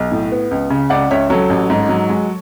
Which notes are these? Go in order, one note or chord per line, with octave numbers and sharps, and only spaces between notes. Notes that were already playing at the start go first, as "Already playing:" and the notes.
Already playing: B1
A2
B3
C#2
C#3
C#2 D5 F#5
C#2 C#5 E5
F#3 A4 C#5
A1
G#2
F#3
G#3